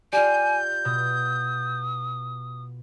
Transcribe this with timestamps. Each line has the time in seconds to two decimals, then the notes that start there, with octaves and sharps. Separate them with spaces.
0.13 F4 G4 D5 G#5 G6
0.85 B2 D#6